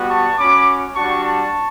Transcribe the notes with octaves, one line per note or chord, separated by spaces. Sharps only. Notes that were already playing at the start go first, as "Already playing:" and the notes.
Already playing: G3 B3 F#4
A5 C#6
C#4 F#4 B5 D6
G3 D4 F#4 A5 C#6
A5 C#6